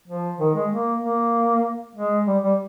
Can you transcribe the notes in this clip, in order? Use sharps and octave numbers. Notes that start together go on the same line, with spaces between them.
F3
D#3
G#3
A#3
A#3
G#3
G3
G3